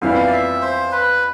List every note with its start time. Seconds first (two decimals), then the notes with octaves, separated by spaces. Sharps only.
0.02 F2 E3 G3 B3 E4 F5
0.27 D5
0.32 E5
0.62 C5
0.92 B4